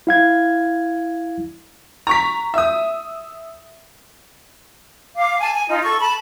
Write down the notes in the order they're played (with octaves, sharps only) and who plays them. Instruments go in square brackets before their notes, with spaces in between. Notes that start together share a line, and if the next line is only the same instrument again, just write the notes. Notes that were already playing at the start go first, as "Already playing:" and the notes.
[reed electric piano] E4 F5 G#6
[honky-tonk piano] A#5 C#6 B6
E5 D#6
[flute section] F5 D6
G#5 A5
G#5
D#4 F4
A4 C#6
A5 B5